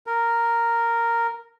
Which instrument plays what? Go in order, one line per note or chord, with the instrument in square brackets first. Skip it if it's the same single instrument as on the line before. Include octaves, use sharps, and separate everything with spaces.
[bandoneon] A#4